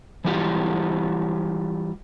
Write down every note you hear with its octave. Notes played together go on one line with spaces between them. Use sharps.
E3 G3 E4 F4 G4